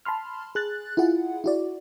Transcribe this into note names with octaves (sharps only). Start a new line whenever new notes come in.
A5 B5 C6 F6
G#4 F#6 A6
E4 F4 G#4 F#5
E4 F#4 D5